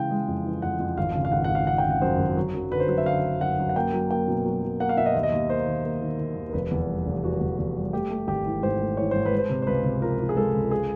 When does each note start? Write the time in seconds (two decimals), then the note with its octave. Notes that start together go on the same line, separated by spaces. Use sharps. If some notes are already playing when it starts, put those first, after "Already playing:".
Already playing: C#3 E3 G#3 G5
0.11 G#3
0.28 F2
0.45 E3
0.62 F2 F#5
0.79 F2
0.98 G#1 F5
1.15 C#3
1.25 F5
1.32 G#1 F#5
1.44 F#5
1.50 G#1
1.55 F5
1.67 C#3 F#5
1.78 G5
1.84 C#3
1.90 F#5
2.02 F#2 C5
2.19 G#1
2.37 F#3
2.54 F#2
2.72 D3 B4
2.80 C5
2.89 F#3 B4
2.98 E5
3.06 D3 F5
3.24 D3
3.41 F#2 F#5
3.59 F#2
3.69 F#5
3.76 A#3 G5
3.93 F#3
4.10 A#3 G5
4.28 B2
4.46 F#3
4.62 F#3
4.80 A#3 F#5
4.89 F5
4.97 B2 E5
5.06 D#5
5.14 D#2 E5
5.23 D#5
5.32 D#2
5.50 A#3 C5
5.67 D#3
5.84 A#3
6.02 D#3
6.19 D#3
6.36 D#2
6.49 A#4
6.53 F1 B4
6.71 E2
6.88 G3
7.06 F1
7.24 E2 F#4
7.41 E2
7.58 E2
7.76 G3
7.93 A3 G4
8.10 A3
8.27 G#1 G4
8.46 E3
8.63 G#2 C5
8.80 A3
8.97 E3 C#5
9.11 G#2 C5
9.25 B4
9.32 G#3
9.39 C5
9.50 C3
9.62 C5
9.67 C#2 B4
9.84 C3
10.02 F3 A#4
10.19 F3
10.29 G#4
10.37 G#3 A4
10.54 C#2
10.71 G#4